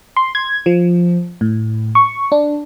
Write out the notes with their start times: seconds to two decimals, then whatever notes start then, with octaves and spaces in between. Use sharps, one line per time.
0.17 C6
0.35 G#6
0.66 F3
1.41 A2
1.95 C#6
2.32 D4